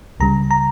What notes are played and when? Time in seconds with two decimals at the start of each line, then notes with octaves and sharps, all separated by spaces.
0.20 C#2 C#3 G3 A#5
0.51 A#5